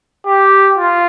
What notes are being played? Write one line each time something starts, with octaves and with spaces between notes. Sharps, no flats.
G4
F4